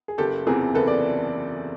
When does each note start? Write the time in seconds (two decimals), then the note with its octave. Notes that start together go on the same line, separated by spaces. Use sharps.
0.08 G#4
0.18 F#1 G4 A4
0.47 E2 C3 E3 G#4 A#4
0.75 F#1 A4 B4
0.87 D5